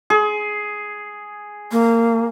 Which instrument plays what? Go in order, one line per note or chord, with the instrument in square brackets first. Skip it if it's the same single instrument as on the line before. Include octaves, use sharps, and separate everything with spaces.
[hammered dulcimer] G#4
[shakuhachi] A#3